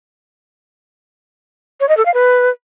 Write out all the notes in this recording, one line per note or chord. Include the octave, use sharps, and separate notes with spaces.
C#5
D#5
A4
F5
B4